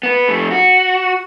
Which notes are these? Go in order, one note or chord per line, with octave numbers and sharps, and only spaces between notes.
B3 B4
F2 A3
F#4